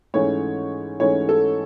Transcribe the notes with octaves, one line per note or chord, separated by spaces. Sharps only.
G#2 E3 A3 C#4 C#5
G#2 E3 A3 C#4 C#5
A4